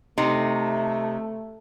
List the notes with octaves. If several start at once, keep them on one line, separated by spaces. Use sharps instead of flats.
C3 A3 D#4